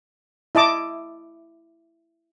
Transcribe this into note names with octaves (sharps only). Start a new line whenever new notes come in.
E4 D#5 A5 D6